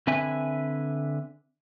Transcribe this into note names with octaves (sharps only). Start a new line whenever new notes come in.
D3 C4 B4 E5 G#5